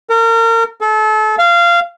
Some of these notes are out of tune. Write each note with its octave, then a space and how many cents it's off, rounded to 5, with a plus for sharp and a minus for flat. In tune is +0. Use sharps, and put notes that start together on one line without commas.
A#4 -35
A4 -30
F5 -20